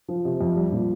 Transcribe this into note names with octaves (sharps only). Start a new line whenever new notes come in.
F3
C3
F2
G3
A#2